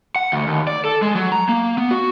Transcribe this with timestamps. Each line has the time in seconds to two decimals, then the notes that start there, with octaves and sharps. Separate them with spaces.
0.16 F#5
0.32 D2
0.47 D#2
0.67 D5
0.85 A4
1.02 G#3
1.15 F#3
1.32 A#5
1.49 A#3
1.78 B3
1.91 F#4